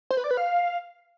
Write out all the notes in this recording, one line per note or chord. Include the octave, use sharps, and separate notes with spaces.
C5
B4
D5
B4
F5